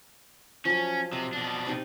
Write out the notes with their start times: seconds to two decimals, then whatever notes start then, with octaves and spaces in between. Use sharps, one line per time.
0.65 F3 F#3 C#4
1.13 C3 D#5
1.33 B2 D4
1.66 C3 D#4